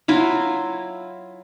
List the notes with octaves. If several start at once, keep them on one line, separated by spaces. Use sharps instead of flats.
F#3 E4 F4